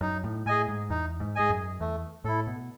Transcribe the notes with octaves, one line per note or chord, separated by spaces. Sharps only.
F#2 D#4
A2
A2 G#4 D#5 G#5
G#2
E2 D#4
G#2
G#2 G#4 D#5 G#5
F#2
E2 A3
A2 E4 A4
B2